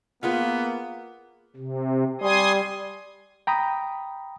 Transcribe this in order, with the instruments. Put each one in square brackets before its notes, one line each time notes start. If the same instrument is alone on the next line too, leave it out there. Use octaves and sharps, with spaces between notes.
[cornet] A#3 [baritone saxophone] B3 [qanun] F4 G#4 F5
[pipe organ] C3
[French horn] G3 [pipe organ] G#5 C6 D#6
[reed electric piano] G5 A#5 B5 D#6